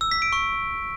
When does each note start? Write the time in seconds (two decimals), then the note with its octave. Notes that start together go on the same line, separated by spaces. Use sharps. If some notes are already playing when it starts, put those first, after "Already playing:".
0.01 E6
0.11 B6
0.22 D7
0.32 C#6